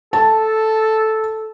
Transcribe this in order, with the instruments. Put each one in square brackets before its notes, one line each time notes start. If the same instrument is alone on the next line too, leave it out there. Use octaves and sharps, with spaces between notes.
[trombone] A4 [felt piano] A5